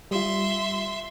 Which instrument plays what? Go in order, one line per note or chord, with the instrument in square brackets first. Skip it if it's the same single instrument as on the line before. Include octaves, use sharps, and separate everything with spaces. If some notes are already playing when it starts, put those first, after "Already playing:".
[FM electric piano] G3 F4 [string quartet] E5 C6